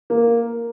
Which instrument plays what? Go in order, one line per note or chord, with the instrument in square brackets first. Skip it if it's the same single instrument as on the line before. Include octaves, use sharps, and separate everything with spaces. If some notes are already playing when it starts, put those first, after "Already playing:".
[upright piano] A#3